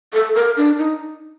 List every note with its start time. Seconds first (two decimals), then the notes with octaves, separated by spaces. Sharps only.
0.14 A4
0.35 A#4
0.57 D4
0.78 D#4